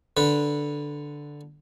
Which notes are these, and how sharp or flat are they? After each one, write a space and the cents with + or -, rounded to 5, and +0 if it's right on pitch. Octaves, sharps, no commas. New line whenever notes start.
D3 +0 B4 -10